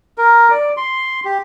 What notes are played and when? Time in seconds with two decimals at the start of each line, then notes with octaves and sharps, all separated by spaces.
0.18 A#4
0.51 D5
0.77 C6
1.25 G4